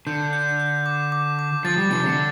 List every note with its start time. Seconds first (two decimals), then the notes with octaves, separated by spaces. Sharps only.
0.07 D3 G6
0.33 G6
0.60 G6
0.86 D6
1.12 D6
1.39 D6
1.65 F3 A6
1.78 G3
1.91 C3 F3 A6
2.04 D3